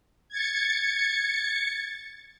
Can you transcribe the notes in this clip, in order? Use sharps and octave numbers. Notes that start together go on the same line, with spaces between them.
G#6 A6 C#7